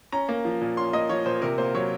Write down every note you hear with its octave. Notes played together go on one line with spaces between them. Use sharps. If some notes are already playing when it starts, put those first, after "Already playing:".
C#4 A#5
A#3
F3
A#2
C#4 C6
A#3 D#5
F3 C#5
A#2 C5
C3 A#4
A#3 C5
F#3 C#5